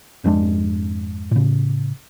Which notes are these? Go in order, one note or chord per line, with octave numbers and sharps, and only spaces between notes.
G#1 F2 G#3 D4
A2 C#3